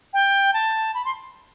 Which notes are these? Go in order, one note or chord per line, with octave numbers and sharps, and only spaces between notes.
G5
A5
B5
C6